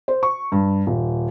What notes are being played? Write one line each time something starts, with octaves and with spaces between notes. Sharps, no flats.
C5
C#6
G2
D#1